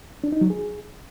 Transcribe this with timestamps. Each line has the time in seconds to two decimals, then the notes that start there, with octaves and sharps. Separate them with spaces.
0.24 D4
0.32 D#4
0.41 F#3
0.50 G#4